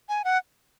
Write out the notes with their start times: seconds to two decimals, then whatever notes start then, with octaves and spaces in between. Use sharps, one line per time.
0.09 G#5
0.24 F#5